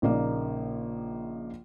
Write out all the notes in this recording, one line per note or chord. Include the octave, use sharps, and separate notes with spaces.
A#1 C#3 A#3 D#4 D5